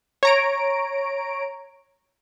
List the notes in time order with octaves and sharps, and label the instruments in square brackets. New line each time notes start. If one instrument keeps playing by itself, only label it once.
[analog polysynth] C#5 A#5 D7